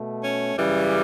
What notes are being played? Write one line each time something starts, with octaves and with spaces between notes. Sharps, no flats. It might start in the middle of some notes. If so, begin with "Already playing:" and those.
Already playing: B2 A3
C#4
F#2 C#3 E3 G3